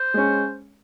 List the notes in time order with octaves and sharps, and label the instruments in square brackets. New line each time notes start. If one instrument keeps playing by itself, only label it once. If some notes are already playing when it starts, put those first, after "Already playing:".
Already playing: [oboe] C5
[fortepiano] G#3 C#4